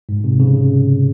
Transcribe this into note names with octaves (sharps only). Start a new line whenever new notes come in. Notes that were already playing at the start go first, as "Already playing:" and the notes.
G#2
C3
C#3